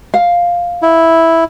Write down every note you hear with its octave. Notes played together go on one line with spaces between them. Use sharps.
F5
E4